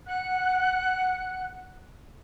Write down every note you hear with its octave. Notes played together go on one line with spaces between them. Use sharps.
F#5 F#6